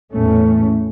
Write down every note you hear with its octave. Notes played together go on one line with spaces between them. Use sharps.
E2 A2 A3 C#4